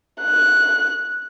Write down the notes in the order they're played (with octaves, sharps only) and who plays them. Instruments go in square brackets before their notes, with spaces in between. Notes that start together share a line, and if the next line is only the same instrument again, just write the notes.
[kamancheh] F#6